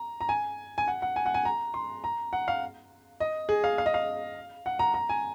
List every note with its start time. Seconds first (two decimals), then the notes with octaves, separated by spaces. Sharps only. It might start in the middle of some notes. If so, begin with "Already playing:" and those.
Already playing: A#5
0.21 A#5
0.29 G#5
0.78 G#5
0.88 F#5
1.02 F#5
1.16 G#5
1.26 F#5
1.34 G#5
1.45 A#5
1.74 C6
2.04 A#5
2.33 F#5
2.48 F5
3.20 D#5
3.49 G#4
3.64 F5
3.78 F5
3.86 D#5
3.94 F5
4.66 F#5
4.79 A#5
4.94 A#5
5.09 G#5